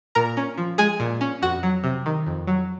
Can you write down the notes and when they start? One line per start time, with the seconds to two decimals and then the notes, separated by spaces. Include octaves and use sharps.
0.15 A#2 A#4 A#5
0.37 C#4
0.58 F3
0.78 G#3 G#4 G#5
1.00 A#2
1.21 C#4
1.42 F2 F#4 F#5
1.63 F#3
1.84 C3
2.06 D#3
2.26 F2
2.47 F#3